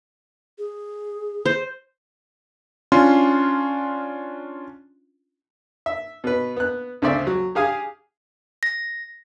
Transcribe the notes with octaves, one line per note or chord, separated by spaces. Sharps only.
G#4
C5
C#4 D4 F4 C6
E5
B2 B4
B3 F#6
D2 C#3 C4 C5 D5 E5
F#3
G4 G#4 F5 G#5 D#6
A#6